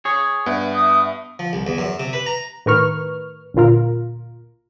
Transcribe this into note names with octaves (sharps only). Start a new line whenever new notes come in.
G#4 C#5
G2 B3 E5
D#6
F3
C2
E2
F#2
C3
B4
A#5
A2 D#3 A#4 B4 C#6 F6
G1 D2 A#2 F4 A#4